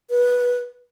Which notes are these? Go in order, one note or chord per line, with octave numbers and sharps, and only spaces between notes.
B4